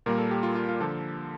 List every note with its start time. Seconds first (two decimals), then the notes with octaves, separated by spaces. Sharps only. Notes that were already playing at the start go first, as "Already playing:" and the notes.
0.06 A#2 G3 A#3 A#4
0.18 A4
0.31 G4
0.43 F4
0.55 F4
0.69 F4
0.80 D3 F3 A#3 A4